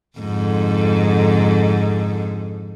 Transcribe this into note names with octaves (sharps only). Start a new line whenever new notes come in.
F2 G#2 D3